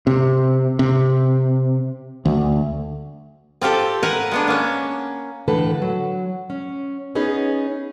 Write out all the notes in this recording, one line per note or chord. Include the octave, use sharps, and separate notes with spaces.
C3
C3
D2
C4 F4 G4 A4
A#4 B4 F#5 G#5 A#5
G#3 B3 D4
A#3 C#4
A2 D3 E3 A4 B4
F#3
C#4
B3 C#4 D#4 G#4 B4